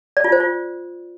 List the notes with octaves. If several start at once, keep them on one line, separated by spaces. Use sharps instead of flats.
D5
F4
C5
F4